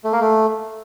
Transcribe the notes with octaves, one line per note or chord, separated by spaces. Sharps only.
A3
A#3
A3